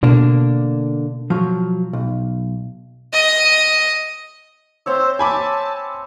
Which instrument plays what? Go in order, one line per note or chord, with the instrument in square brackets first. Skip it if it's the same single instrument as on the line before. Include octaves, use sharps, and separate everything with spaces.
[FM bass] B2 [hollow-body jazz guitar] D3 A#3 D4
[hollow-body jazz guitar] F3 F#3
B1
[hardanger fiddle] D#5
[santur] C4 C#5 E5 [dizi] C5
[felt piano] G#5 B5 D6 [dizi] A5